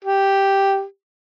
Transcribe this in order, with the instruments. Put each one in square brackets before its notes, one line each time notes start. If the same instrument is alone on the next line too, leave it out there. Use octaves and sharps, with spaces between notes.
[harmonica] G4